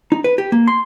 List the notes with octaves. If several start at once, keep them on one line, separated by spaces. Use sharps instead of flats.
D#4
B4
G4
A#3
C6